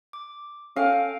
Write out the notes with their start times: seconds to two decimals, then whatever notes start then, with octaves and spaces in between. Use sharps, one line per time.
0.13 D6
0.76 C#4 A4 F5 G5